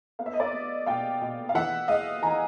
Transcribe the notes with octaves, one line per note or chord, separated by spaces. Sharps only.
B3 F5
E5
D#5
D5 E5
B3
B2 F5 G5
B2
F5
E3 E5 F#5
G#3 D#5 F5
E3 G#5 A#5